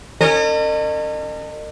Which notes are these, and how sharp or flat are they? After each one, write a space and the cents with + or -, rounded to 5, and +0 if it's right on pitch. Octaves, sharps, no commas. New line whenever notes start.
C#4 -20 A#4 -45 D#5 -40